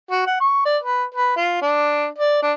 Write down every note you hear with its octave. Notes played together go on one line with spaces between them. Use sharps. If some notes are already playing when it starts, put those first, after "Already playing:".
F#4
F#5
C#6
D5
B4
B4
F4
D4
D5
D4